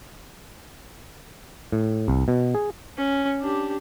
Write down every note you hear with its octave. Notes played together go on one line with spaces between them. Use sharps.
A2
C2
B2
G#4
C#4
D4 G4